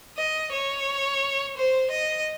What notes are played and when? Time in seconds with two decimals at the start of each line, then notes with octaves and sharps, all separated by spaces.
0.17 D#5
0.52 C#5
1.57 C5
1.91 D#5